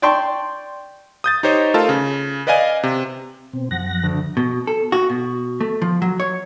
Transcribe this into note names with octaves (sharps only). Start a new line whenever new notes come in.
D5 G5 A5 C6 C#6
D#6 G6 A6
D#4 G4 C5 C#5 D#5
A3 F4 A4 A#4 F5 A5
C#3
B4 D5 D#5 F5 G#5
C3
B2 C4
F#2 F3 F#5 A#6
D2
B2
A4
F#4
B2
A3
F3
F#3
C#5